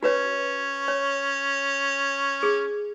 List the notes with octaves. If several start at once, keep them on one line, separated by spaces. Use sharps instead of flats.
C#4 F#4 B4 C#5
C#5
G#4